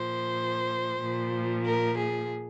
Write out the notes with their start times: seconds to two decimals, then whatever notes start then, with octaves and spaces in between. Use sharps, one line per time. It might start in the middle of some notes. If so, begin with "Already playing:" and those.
Already playing: A#2 F3 C5
1.01 A#2 F3
1.66 A#4
1.98 G#4